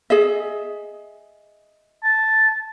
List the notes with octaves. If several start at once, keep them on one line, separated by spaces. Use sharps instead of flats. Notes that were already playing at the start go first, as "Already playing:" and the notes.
G#4 D#5 E5
A5